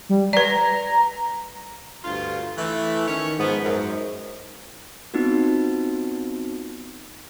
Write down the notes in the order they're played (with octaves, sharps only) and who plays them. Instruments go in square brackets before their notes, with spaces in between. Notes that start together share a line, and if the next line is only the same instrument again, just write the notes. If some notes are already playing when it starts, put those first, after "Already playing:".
[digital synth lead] G3
[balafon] B4 D5 [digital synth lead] A#5
[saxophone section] D2 G2 F4
E3 A3
[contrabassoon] D#3 [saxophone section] C#4 C#5
[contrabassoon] G#2 [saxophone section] F3 B3
[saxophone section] F#2
[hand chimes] B3 C4 D#4 F4 F#4